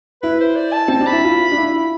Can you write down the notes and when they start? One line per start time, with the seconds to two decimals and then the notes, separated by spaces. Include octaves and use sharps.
0.22 E4 B4
0.40 C5
0.56 D5
0.73 A5
0.88 C4 A5
1.01 D4
1.07 B5
1.13 E4
1.24 F4
1.52 D4
1.58 E4